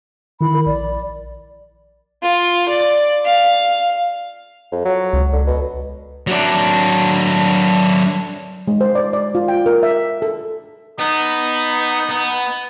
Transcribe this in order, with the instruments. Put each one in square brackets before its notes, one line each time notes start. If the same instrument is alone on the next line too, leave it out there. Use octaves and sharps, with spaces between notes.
[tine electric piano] D#3 E4 [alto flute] B5
[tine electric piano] A#4
[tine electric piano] A#1 [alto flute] D5
[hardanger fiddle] F4
D5
F5
[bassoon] F2
F#3
[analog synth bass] C#2
[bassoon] D3
B2
[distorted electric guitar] F#3 D4
[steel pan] G#3
C5
D5
D5
F4
G5
A#4
E5
A4
[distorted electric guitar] B3 [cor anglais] D#4
[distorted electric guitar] B3